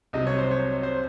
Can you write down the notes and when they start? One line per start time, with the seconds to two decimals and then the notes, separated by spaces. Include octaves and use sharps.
0.13 C2 C3 F#3 D#5
0.27 C#5
0.38 C5
0.51 C#5
0.83 C5